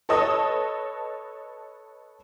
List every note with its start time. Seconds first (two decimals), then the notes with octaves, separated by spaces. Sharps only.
0.09 A4 B4 C#5 D#5 A5 D#6